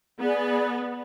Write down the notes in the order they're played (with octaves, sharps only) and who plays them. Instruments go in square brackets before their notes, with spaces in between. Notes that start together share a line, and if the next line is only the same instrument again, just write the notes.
[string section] B3 [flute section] G#4 D5